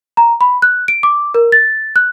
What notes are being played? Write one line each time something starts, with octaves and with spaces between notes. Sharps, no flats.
A#5
B5
F#6
D7
D6
A#4
A6
F#6